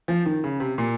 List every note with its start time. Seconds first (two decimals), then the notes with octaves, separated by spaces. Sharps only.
0.08 F3
0.26 D#3
0.44 C#3
0.60 C3
0.78 A#2